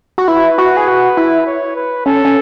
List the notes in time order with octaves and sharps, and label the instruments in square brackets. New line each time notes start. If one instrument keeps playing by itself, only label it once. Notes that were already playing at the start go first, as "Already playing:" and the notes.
[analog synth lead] F#4
[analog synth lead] E4 [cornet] B4
[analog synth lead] F#4
G#4
F#4
E4
[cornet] C#5
B4
[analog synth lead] C#4 [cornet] A4
[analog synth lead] C#4